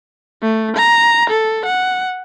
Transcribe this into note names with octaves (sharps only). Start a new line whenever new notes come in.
A3
A#5
A4
F#5